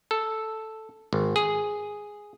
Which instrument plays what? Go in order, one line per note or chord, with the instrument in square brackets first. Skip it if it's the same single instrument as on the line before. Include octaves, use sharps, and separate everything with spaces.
[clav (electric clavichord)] A4
G#1
G#4